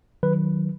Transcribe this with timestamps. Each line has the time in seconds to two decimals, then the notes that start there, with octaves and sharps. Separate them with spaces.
0.23 D#3 F#3 B4